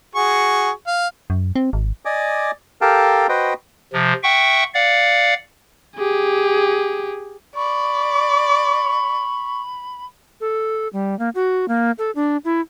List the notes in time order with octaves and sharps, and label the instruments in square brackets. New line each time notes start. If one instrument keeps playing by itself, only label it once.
[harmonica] F#4 G#4 C#6
F5
[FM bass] F#2
C4
G#1
[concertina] D5 D#5 G#5 D6
G4 A4 A#4 F5 G5 A5
F#4 B4 C5 D#5 G5
[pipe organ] C3 F3
E5 F#5 G5 C#6
D5 F5 F#5
[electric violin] G4 G#4
[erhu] D5 [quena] B5 [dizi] C#6
[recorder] A4
G3
A#3
F#4
A#3
A4
D4
E4